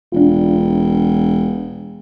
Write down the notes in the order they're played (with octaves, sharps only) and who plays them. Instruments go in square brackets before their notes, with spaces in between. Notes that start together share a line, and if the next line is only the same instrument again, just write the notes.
[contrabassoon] E1 [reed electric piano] D4 F4